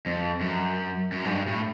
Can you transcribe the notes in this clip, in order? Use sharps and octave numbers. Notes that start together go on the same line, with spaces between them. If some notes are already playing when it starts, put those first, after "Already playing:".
F2
F#2
F#2
G#2
G2
A2